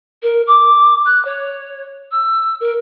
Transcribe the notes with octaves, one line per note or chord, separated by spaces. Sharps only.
A#4
D6
F#6
C#5
E6
A#4